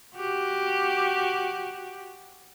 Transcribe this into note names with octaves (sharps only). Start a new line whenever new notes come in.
F#4 G4